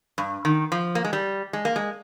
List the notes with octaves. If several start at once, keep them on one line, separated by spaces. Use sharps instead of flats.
G2
D#3
F3
A#3
G#3
G3
G#3
A#3
G#3